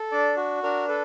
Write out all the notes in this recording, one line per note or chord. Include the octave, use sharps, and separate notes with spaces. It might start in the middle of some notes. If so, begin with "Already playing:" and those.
Already playing: A4
D4 D5
F#4
D4 A#4
A4 B4